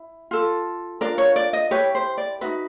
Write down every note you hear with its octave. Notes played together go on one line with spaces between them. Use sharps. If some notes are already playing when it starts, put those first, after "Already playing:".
Already playing: E4
F4 A4
D4 F4 A#4 D5
C#5
D5
D#5
E4 G4 B4 C#5
C5
D5
D#4 F#4 B4 E5